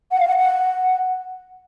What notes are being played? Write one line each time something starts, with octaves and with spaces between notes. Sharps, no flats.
F#5
F5
F#5
F#5